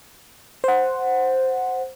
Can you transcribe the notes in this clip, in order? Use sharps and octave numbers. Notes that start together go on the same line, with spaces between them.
C5 F#5